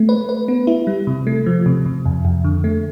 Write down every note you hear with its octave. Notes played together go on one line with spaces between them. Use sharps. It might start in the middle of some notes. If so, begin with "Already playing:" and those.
Already playing: A3
B4
B4
B3
E4
G3
C3
A3
F3
C3
C3
F2
F2
D3
A3